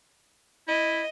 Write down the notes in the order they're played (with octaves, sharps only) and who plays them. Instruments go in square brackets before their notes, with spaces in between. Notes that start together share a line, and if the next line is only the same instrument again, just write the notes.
[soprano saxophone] E4 [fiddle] D#5